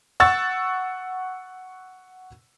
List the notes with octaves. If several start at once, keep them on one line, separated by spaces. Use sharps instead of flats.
F#5 C#6 E6 A6